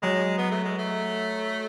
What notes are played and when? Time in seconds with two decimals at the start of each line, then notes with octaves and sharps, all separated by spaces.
0.03 F#3 G#3
0.38 B3
0.51 A3
0.64 G#3
0.78 A3